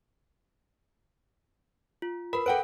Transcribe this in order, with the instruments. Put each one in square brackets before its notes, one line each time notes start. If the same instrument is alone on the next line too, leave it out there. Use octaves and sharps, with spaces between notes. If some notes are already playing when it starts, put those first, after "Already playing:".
[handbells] F4
[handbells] A#4 B4 [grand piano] B5
[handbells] A4 D7 [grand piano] B4 F#5 G5